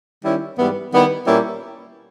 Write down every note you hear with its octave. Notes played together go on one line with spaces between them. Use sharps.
D#3 G3 C#4 E4
G#2 E3 G3 B3
D#3 G3 B3 E4
A#2 G3 A#3 C#4 E4